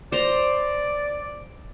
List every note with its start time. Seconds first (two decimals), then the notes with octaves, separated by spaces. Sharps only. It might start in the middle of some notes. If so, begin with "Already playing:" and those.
0.12 C5 D5 A#5